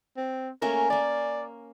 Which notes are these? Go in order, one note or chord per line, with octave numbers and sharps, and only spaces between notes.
C4
A3 A#3 C#4 A#4
A#3 A#4 D5